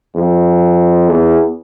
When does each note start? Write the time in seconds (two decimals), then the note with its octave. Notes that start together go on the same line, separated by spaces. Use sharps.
0.15 F2
1.09 E2